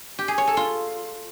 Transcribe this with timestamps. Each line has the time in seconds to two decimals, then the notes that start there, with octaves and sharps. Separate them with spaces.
0.19 G4
0.28 G#4
0.38 C#5
0.47 A4
0.57 F4